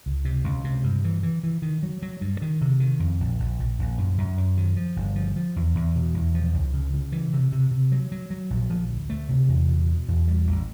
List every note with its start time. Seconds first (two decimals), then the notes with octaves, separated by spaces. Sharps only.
0.06 C#2
0.25 C3
0.44 C#2
0.64 C3
0.84 G2
1.04 E3
1.23 E3
1.43 E3
1.62 D#3
1.83 F#3
2.02 F#3
2.21 G2
2.42 D#3
2.61 C3
2.80 D#3
3.00 F2
3.20 A#1
3.40 A#1
3.59 A#1
3.79 A#1
3.98 F#2
4.18 F#2
4.37 F#2
4.57 D#3
4.76 F3
4.96 G1
5.16 F3
5.36 F3
5.56 E2
5.75 E2
5.96 B2
6.14 E2
6.35 F3
6.54 C#2
6.73 C#3
6.94 C#3
7.12 E3
7.33 C3
7.52 C3
7.71 C3
7.92 F#3
8.12 F#3
8.30 F#3
8.50 A#1
8.70 F3
8.89 D2
9.10 A3
9.29 C3
9.48 E2
9.69 B2
9.88 B2
10.08 E2
10.27 G3
10.47 A1